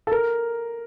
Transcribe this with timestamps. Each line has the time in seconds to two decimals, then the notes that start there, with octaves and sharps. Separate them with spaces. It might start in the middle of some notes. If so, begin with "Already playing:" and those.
0.07 A4
0.12 A#4